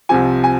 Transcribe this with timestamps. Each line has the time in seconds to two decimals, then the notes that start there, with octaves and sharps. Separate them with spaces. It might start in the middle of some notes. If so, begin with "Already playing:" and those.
0.09 C2 C3 F3 G#5
0.44 G#5